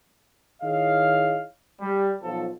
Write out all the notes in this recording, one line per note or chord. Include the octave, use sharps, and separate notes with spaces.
D#3 E4 G#4 C#5 D#5 F5
G3
B1 F3 A4